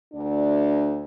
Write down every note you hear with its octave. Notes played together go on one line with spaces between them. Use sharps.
D2 D4